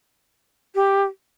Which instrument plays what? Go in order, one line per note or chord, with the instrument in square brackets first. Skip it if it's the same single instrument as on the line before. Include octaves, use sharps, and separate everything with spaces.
[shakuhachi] G4